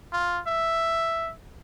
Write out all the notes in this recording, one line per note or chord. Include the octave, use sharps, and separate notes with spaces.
F4
E5